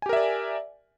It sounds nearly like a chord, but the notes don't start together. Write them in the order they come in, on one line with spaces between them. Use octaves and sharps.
G#5 G4 A#4 E5 D5